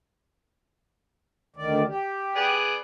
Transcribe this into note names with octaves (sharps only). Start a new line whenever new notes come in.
D2 D#3 D5
G4
B3 G#4 D5